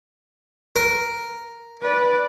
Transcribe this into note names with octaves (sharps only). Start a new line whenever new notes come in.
A#4
B4 D5